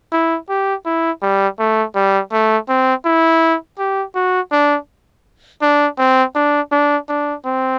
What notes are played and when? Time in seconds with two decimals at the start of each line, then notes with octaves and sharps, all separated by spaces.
0.13 E4
0.49 G4
0.86 E4
1.22 G3
1.59 A3
1.96 G3
2.32 A3
2.69 C4
3.05 E4
3.79 G4
4.15 F#4
4.52 D4
5.62 D4
5.99 C4
6.36 D4
6.72 D4
7.09 D4
7.46 C4